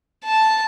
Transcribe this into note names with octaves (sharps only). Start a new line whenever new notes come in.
A5